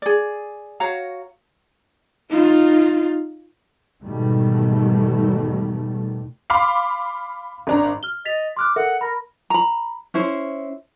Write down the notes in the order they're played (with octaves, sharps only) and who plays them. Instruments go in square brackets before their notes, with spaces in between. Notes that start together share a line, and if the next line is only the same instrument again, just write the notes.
[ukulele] G#4 D5
F#4 C#5 F5 A#5
[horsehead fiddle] D#4 F4
[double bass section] E2 G#2 B2 D#3 G3 A3
[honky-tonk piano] F5 B5 C6 D6 F6 C7
G#1 D4 A#5
[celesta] F6 G7
[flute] D#5 [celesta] A6 B6 F7
[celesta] C6 F6 F#6 [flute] D6
[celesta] A4 A#4 E5 [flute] F#5
[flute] A#4 [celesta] B5
[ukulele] A#5 B5
C#4 E4 C5